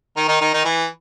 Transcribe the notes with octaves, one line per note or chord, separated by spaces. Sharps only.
D#3 D#4
D#3 D#4
D#3 D#4
D#3 D#4
E3 E4